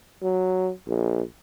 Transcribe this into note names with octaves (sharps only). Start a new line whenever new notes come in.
F#3
A#1